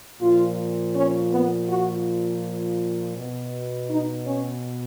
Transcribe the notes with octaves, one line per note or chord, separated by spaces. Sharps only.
A#2 F3 F4
C#4
B3
F#4
B2
D#4
C#4